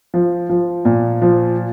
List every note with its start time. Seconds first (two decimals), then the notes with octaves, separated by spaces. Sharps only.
0.14 F3
0.49 F3
0.85 A#2
1.22 F3